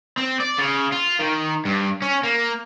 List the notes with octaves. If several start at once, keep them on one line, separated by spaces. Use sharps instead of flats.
C4
D5
C#3
F4
D#3
G2
C#4
A#3